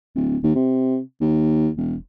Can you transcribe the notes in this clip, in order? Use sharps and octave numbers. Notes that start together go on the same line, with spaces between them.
D1
D#2
C3
D#2
E1